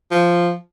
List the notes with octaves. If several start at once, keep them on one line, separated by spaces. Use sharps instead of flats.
F3